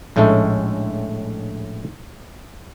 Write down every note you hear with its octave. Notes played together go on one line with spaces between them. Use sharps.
A#1 A2 G#3 A3 C#4 A4